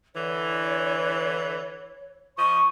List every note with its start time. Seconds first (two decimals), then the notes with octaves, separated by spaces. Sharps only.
0.15 D3 E3 C#5
2.38 F3 D#5 C#6